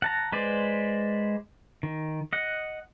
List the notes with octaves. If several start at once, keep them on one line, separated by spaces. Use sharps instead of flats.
F#5 A5 A#5
G#3 B4 C5 D5
D#3
D#5 F#5